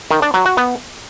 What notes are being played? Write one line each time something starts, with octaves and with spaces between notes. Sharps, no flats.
D#3
D4
F#3
F#4
B3